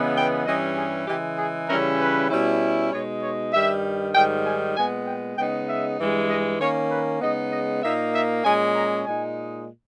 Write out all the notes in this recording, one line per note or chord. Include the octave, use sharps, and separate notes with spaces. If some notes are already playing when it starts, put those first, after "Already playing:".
Already playing: C#3 E3 G#3 B3
G5
G2 E3 G3 C#4 D#5
G#4
C#3 E3 G#3 G4
G#4
C#3 E3 G3 C#4 E4 A#4
B4
B2 G3 C#4 E4
B2 G#3 D#4 C#5
C#5
G2 D#3 G3 E5
G#2 D#3 G3 G5
G#5
A#2 G#3 B3 G#5
G5
C#3 G#3 B3 D#4 G5
E5
G2 E3 G#3
D#5
D#3 A#3 C#4 C#5
B4
C#3 G#3 B3 D#4 D#5
D#5
A#2 A#3 D#4 E5
E5
A#2 G#3 C#4 G#5
A#5
A#2 G#3 D#4 G#5